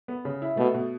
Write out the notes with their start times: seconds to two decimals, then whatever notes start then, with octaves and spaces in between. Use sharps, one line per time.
0.08 B3
0.25 C#3
0.42 E4
0.57 B2 A3
0.74 B2